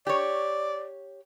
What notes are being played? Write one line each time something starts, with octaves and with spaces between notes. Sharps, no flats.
G4 C#5 D5